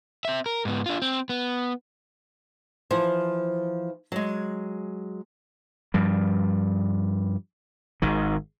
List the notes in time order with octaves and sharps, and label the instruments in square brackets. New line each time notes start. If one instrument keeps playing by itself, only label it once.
[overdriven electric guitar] C4 E5
A#4
G#2 B3
D4 F4
C4
B3
[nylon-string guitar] E3 F3 C5
F#3 G#3
[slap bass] G2 F3 G3
G#1 G#2 D#3